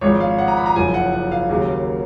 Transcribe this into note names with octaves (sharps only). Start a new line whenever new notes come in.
G#1 G#2 F3 C#5
F5
F#5
A#5
B5
A#5
F#1 F#2 F3 G#5
F#5
F#5
F5
D#2 C#3 F#3 A#3